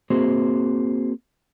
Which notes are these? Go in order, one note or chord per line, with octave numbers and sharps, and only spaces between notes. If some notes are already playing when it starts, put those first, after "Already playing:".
A#3 C4 F#4 G#4 C5